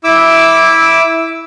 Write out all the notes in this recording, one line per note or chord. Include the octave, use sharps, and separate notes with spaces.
E4 D6 E6